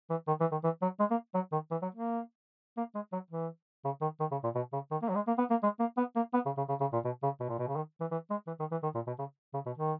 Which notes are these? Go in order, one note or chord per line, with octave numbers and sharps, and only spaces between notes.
E3
D#3
E3
D#3
E3
F#3
G#3
A#3
F#3
D#3
E3
F#3
A#3
A#3
G#3
F#3
E3
C#3
D#3
D#3
C#3
A#2
B2
C#3
D#3
A#3
F#3
G#3
A#3
B3
A#3
G#3
A#3
B3
A#3
B3
C#3
C#3
C#3
C#3
A#2
B2
C#3
B2
A#2
B2
C#3
D#3
E3
E3
G#3
E3
D#3
E3
D#3
A#2
B2
C#3
C#3
B2
D#3